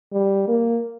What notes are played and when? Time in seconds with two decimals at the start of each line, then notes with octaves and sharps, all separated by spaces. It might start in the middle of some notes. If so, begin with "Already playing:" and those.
0.12 G3
0.48 A#3